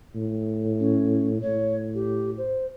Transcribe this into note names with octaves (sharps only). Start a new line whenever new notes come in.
A2
C#4
A2 C#5
G4
C5